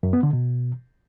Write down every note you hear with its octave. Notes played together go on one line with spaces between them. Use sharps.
F#2
B3
D3
B2